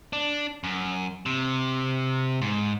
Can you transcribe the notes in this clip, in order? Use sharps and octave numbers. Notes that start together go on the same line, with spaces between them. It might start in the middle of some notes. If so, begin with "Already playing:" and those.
D4
F#2
C3
G#2